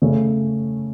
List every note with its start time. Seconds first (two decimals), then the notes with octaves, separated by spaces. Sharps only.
0.02 C#3 A3 C#4